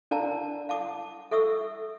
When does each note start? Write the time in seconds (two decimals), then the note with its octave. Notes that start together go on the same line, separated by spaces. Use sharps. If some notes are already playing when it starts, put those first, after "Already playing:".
0.11 D4 A#4 D5 F5 A5 A#5
0.69 F5 A5 D6 D#6
1.31 A4 E5 C#6 D#6 E6